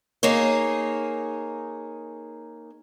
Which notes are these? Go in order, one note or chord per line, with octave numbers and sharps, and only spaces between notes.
A#3 D#4 G#4 C#5